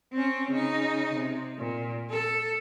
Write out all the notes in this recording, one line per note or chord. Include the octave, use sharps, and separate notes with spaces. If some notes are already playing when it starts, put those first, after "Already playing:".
C4 C#4
C#3 D#4
C3
A#2
A4